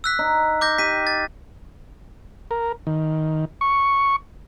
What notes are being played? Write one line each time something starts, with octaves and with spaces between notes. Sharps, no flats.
E6 F#6 B6
D#4
D6 G6 A#6
G4 B6 D#7
A6
A#4
D#3
C#6